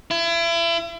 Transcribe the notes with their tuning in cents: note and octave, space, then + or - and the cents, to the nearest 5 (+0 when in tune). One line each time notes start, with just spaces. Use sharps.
E4 +35